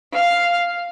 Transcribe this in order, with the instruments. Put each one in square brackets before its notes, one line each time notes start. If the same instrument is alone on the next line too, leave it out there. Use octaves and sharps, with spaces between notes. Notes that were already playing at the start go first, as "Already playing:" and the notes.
[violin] F5